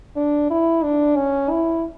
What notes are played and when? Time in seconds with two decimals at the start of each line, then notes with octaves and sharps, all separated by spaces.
0.16 D4
0.50 E4
0.83 D4
1.16 C#4
1.50 E4